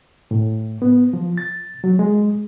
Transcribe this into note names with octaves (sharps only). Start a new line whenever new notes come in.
A2
B3
F3
A6
F#3
G#3